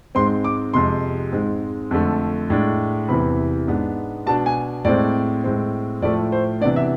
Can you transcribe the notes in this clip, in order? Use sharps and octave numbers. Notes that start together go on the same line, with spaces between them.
G#2 G#3 C4 C6
D6
F2 C3 G#3 C6
G#2 G#3 C4
F2 D3 A3
A2 G#3 D4
E2 C3 E3 B5
G#2 G#3 B3 D4
B2 B3 D4 A5
G#5
A2 G#3 C4 D5
A2 G#3 C4
A2 F3 A3 D5
C5
C3 E3 B3 D4 D5
E5